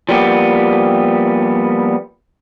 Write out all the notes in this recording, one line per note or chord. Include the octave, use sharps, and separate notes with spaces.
F3 G3 A#3 B3 G4